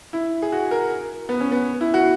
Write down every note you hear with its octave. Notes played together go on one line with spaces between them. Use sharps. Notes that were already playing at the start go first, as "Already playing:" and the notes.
E4
G#4
F#4
A#4
B3
C#4
B3
E4
F#4